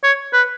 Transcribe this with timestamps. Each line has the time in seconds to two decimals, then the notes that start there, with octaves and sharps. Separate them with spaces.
0.03 C#5
0.33 B4